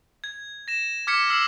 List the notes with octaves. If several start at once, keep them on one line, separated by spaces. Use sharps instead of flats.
G#6
A#6 E7
D6 F6 G#6 B6 C#7 E7
E6 F6 C7 E7 F#7